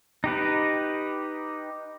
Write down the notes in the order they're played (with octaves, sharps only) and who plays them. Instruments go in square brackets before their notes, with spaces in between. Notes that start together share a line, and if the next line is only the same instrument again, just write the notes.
[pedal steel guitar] D#4 G4 B4